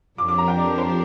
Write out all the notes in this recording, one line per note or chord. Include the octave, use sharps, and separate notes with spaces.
F2 F3 D4 G4 A#4 D6
D6
A#5
G5
D5
C5